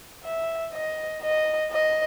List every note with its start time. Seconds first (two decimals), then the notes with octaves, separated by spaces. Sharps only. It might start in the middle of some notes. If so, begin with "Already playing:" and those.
0.24 E5
0.73 D#5
1.23 D#5
1.71 D#5